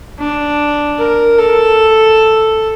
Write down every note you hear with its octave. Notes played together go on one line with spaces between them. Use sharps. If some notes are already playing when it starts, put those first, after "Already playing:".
D4
A#4
A4